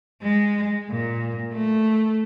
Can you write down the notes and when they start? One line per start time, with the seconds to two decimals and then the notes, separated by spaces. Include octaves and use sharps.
0.22 G#3
0.90 A#2
1.52 A3